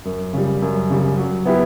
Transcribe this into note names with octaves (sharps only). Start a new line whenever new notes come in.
F#2
C#3 G3
F#2
C#3 G3
F#3
B3 E4 G4